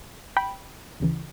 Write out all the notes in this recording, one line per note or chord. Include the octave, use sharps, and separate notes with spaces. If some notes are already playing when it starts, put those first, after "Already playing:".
G5 B5
D2 C#3 E3